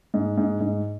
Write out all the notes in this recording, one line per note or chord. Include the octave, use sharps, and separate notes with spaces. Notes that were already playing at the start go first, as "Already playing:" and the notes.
G#2
G#2
G#2